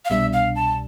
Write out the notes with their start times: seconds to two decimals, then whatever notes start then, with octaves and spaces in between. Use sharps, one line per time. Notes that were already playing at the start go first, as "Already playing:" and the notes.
0.05 F5
0.10 C2 B2 G3 D4 E5
0.33 F5
0.56 A5